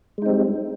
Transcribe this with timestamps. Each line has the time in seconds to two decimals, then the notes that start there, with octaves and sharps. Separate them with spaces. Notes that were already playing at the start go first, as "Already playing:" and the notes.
0.18 G#3
0.22 D#4
0.26 C4
0.30 G3